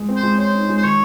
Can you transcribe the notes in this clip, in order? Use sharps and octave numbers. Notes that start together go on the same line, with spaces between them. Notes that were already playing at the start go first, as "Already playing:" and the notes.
Already playing: G#3
C4
C5
G#3
C5 C#5
D#4
G#3
C5
D#3 C#5